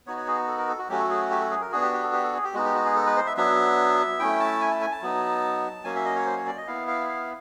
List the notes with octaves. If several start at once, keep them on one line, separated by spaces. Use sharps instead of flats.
B3 D#4 F#4 C#5
C#5
G#4
A4
A#4
A4
F#4
F#3 A3 C#4 F#4 G4
A4
G#4
G4
A4
G#4
A#4
B3 D4 F#4 G#4
G4
G4
A4
G4
A4
G#4
G4
G#3 B3 D#4 F#4
G4
F#4
G#4
A4
B4
C5
E5
F#3 B3 D4 E5
A3 C#4 E4 G5
A5
G#5
A5
G#5
A5
F#3 B3 D#4
F#3 A#3 C#4 G#5
E5
D#5
C#5
C5
C#5
D5
D#5
B3 E4 F5
F5
F5